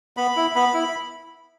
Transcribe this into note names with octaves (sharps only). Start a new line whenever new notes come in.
B3 B5
E4
B3 B5
E4